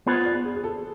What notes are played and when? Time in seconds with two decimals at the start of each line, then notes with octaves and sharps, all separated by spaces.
0.07 B3 F4 G#4 B4 C5
0.25 D5
0.44 G#4
0.55 G#4
0.64 A4